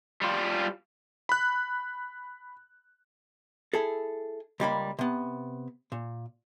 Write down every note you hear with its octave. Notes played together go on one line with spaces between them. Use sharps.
G3 F4
B5 F#6
E4 G#4 A4
C#2 G3 A#3 B5
C3 B3
A#2